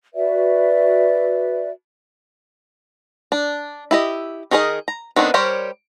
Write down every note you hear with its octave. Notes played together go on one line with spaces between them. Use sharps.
F#4 B4 D5 E5
D4
E4 G4 D#5
D#3 D#4 G#4 A#4 D#5
A#5
D#3 B3 C4 D4
G3 G4 A#4 C5 C#5